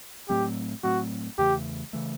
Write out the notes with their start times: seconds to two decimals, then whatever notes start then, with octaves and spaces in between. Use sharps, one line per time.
0.29 A2 F#3 A3 C4 G4
0.83 A2 F#3 A3 C4 F#4
1.38 E2 C#3 E3 A3 G4
1.93 C#3 E3 A3